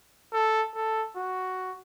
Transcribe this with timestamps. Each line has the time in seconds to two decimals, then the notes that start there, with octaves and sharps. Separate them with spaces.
0.33 A4
0.74 A4
1.16 F#4